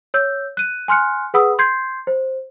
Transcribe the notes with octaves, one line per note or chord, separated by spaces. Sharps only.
C#5 E6 G6
F#6 D#7
G#5 C6 F6 F#6 C#7
G#4 B4 F#5 B5 D#6 E6
C6 G6 G#6 C7
C5